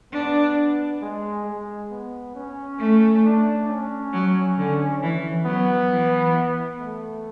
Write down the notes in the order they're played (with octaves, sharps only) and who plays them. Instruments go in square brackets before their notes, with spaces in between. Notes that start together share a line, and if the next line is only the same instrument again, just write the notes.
[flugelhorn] B3 [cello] D4
[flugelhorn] G#3
G#3
B3
C#4
[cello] A3
[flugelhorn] D4
C#4
[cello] F#3
D3
E3
[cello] F#3 [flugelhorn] B3
[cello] E3
[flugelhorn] A3